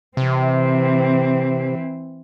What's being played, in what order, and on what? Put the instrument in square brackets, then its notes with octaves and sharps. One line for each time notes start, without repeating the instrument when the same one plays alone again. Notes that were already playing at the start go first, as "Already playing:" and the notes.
[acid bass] C3 [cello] E3 C4